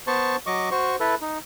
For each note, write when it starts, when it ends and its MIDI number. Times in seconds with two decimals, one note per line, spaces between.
0.07 0.36 59
0.07 0.36 72
0.07 0.36 81
0.07 0.36 85
0.47 0.69 54
0.47 0.69 75
0.47 0.69 85
0.47 0.69 86
0.71 0.96 66
0.71 0.96 72
0.71 0.96 85
1.00 1.15 64
1.00 1.15 69
1.00 1.15 71
1.21 1.38 63